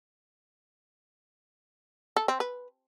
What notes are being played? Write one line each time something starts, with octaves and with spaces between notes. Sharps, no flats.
A4
C4
B4